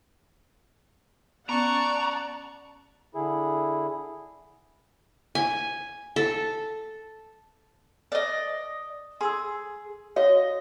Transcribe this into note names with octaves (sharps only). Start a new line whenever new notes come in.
B3 C#4 D5 F#5 A5 A#5 C#6
D3 E4 G#4
G#5
A4
D5 D#5
G#4 C6 D#6 E6
F#4 C#5 D#5 F5